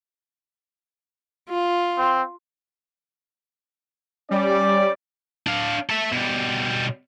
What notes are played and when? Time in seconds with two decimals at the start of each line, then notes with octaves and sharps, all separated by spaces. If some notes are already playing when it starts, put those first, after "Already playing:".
1.49 F4
1.98 C4
4.31 G3 C#4 D5
5.47 D4 F5
5.90 A4 E5
6.12 B2 G3